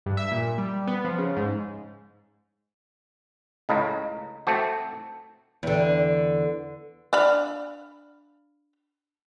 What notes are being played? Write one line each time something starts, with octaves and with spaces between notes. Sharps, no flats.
G2
E5
A#2
G3
B3
F3
C#3
G#2
C#2 A2 C#3 D#5 F5 A#5
A3 C4 F#4 A5
E2 D3
D4 F5 B5